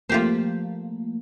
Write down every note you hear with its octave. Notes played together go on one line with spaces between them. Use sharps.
F3 A3 A#3 F4 G4 C5